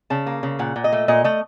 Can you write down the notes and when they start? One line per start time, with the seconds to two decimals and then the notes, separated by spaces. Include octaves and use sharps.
0.10 C#3 A5
0.26 A#3
0.43 C#3
0.59 A#2 F#5
0.76 A#2
0.84 D#5
0.92 A3
1.08 A#2 D#5
1.24 A3 D#5